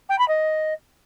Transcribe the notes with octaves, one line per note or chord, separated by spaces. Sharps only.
G5
B5
D#5